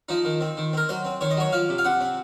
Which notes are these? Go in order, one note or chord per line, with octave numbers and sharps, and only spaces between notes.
F3 D#4
D#3
C4
D#3
C4 A#4
F#3 C5
C4
D#3 C#5
D#5
F#3 C#5
F3 F5
C3
F5
C3 F#5
C4